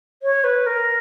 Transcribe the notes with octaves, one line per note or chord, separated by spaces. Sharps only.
C#5
B4
A#4